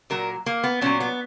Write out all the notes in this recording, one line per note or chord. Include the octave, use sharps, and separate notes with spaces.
A#2 F#3 A#4
A#3
B3
A#2 F#3 C#4
B3